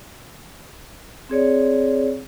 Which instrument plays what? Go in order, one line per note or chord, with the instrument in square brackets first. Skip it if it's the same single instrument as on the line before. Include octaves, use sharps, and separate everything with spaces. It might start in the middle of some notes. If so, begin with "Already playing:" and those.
[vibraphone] C4 G#4 C#5 D5